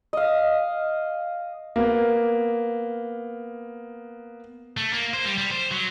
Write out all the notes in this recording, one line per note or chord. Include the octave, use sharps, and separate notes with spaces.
D#5 F5
A#3 B3
A3
A#3
C5
G3
G3
C5
F#3